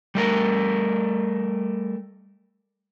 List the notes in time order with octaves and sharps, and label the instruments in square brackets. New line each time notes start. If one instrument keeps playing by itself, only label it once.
[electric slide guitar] G3 A3 A#4